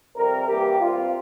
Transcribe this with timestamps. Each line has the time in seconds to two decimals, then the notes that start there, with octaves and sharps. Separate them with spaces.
0.16 F2 C3 G3 A#4
0.47 G2 E3 A#3 G4
0.80 G2 G3 C4 F4